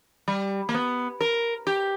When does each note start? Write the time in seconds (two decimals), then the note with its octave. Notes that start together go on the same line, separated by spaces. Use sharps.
0.28 G3
0.69 A#3
0.74 B3
1.21 A#4
1.67 G4